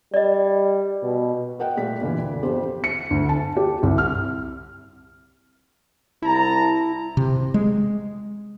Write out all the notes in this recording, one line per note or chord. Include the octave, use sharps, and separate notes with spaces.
G3 D5 D#5
B2
A#4 D#5 F#5 G5
A#2 G3 A3 B6
A#2 D3 E3
D2
G1 F2 G4 C5
C#7
D2
A5
G4
C2
F6
C2 E4 A5 A#5
C3
G#3